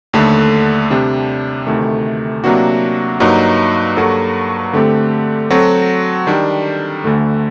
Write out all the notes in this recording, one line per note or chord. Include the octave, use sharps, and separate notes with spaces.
D#2 D3 A3
C3 G3 D4
D2 C3 D#3 A3
C3 F#3 A#3 D4 F#4
G2 F#3 A#3 D#4 F#4
G2 F#3 A#3 F#4 A4
D3 A3 C4 G4
F#3 C4 F#4 A4
D#3 G3 D4
D2 D3 A3